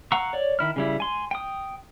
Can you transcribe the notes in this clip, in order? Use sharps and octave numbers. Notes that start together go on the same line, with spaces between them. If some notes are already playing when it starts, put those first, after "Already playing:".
F5 F#5 A#5 C#6 E6
C#5 D5
D#3 E4 F6
C#3 G3 E4
G#5 C6
G5 D#6